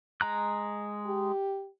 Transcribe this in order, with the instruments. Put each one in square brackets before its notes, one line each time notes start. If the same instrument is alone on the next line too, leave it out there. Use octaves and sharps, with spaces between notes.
[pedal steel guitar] G#3 A#5 F#6
[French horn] G4